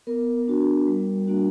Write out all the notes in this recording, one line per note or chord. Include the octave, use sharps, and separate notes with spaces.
B3 A#4
D4 F#4
G3
A#3 D4 F#4